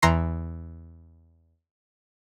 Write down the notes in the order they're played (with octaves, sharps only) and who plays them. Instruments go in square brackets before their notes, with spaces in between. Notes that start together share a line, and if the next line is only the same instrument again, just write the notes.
[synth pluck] E2 E3 A#5 C6 C7